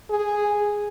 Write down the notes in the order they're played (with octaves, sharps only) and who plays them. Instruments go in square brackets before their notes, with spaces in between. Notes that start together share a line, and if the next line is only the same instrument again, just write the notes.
[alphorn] G#4